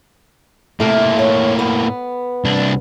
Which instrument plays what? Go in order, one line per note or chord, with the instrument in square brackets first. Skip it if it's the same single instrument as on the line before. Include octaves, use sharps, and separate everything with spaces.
[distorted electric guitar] A2 A#3 [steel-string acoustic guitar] C3 A3
[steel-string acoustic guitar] C#5
B3
[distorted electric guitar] C2 D4